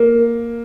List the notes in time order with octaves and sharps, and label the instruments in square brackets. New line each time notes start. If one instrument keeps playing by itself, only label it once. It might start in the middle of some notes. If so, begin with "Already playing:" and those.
Already playing: [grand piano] A#3